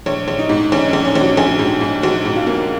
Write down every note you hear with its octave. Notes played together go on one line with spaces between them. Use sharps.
A#1 C#5
A#1
D#4
G#2
A#1 C#4
C#4
A#1
C#4
A#1
F#4
A#1 G#4
G#2
G#2
A#1 F#4
G#2
F4
A#3